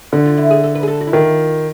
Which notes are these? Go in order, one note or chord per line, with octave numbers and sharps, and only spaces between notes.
D3 F#4
F4
E4
G#4
A4
B4
G#4
A4
F#4
E4
D#3 F4